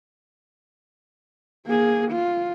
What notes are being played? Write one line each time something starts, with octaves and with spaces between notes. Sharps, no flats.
A#3 G#4
F4